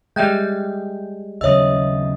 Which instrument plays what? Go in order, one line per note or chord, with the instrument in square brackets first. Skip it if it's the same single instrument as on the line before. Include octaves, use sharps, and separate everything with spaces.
[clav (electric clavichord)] G3 G#3 [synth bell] E5 G5 G6
[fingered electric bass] D#2 C#3 F#3 [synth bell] C#5 E6 [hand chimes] D#5 E5 D#6